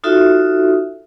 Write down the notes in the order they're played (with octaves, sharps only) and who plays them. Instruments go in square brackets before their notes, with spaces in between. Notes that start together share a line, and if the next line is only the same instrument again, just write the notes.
[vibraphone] D#4 F4 F#4 A4 E5